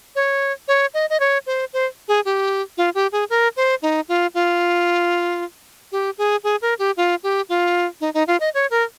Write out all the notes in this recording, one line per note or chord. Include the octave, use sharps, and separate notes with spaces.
C#5
C#5
D#5
D#5
C#5
C5
C5
G#4
G4
F4
G4
G#4
A#4
C5
D#4
F4
F4
G4
G#4
G#4
A#4
G4
F4
G4
F4
D#4
D#4
F4
D#5
C#5
A#4